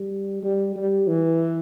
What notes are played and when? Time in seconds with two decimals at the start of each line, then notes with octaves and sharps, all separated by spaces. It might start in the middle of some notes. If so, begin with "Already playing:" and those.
Already playing: G3
0.43 G3
0.76 G3
1.08 E3